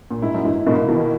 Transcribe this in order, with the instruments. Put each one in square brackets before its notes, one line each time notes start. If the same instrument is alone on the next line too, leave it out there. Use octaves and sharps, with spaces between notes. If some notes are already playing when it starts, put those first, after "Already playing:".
[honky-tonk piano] A#2
[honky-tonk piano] G#2 [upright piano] E4
[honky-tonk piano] F#2
[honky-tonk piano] G#2 [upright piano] E3
[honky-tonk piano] G#2 B2 [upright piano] A#3
[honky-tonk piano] B2 D#3 [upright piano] E3